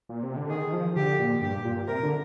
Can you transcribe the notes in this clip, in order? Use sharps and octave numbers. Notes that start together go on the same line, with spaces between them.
A#2
C3
D3
D#3 G#4
D#3
F3
D3 G4
A#2
G2 G4
A#2
C3 A#4
D3